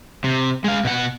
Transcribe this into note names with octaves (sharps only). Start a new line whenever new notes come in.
C3
G#3 F5
B2 F#5